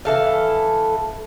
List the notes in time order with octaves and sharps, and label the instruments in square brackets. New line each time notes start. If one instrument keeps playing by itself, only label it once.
[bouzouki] E3 A4 F5